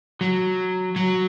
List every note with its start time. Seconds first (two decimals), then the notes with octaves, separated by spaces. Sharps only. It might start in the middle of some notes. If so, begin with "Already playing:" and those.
0.21 F#3
0.96 F#3